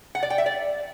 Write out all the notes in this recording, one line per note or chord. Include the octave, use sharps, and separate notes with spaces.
F#5
D5
G5
E5
D5